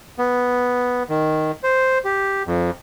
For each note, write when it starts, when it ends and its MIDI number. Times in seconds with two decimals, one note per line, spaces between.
0.18 1.03 59
1.09 1.52 51
1.63 1.98 72
2.05 2.43 67
2.47 2.71 41